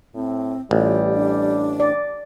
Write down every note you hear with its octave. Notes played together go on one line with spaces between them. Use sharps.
A2 C4
A1 G3 F4
D4
D5